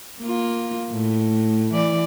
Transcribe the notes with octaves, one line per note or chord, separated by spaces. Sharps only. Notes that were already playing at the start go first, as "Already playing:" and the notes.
A#3 F4
A2
E3 D5